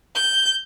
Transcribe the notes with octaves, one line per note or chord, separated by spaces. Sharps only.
G6